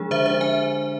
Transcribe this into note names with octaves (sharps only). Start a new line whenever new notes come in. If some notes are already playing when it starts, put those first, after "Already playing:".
Already playing: F3 G#3 D4 G#4
D3 C5 E5
D4 C5 E5
E5 G#5